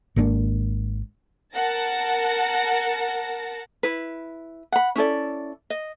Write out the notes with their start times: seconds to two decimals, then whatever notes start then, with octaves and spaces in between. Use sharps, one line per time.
0.16 G#1 A#3 C#4 D4
1.54 A#4 F#5 A5 A#6
3.83 E4 B4
4.72 F#5 B5
4.96 C#4 E4 A4 D5
5.70 D#5